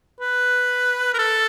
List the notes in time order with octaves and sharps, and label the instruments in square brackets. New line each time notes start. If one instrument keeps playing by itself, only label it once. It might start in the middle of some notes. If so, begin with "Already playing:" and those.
[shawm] B4
A#4
A4